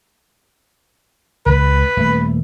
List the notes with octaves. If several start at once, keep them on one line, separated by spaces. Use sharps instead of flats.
C#2 B4
D#1 A3